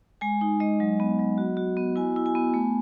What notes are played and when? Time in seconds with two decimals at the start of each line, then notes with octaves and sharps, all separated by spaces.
0.21 G#3 G#5
0.41 D#4
0.60 G#3 D#5
0.80 F#3
1.00 B3
1.19 F#3
1.38 F#4
1.57 F#4
1.77 B3
1.96 E4 G#5
2.16 E4
2.26 G#5
2.35 B3
2.54 A3